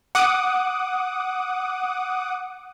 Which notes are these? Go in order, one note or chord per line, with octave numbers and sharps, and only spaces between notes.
F#5 D6 D#6